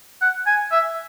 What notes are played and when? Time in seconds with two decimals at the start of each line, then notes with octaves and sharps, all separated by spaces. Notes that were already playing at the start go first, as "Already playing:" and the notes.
0.22 F#5
0.46 G#5
0.72 E5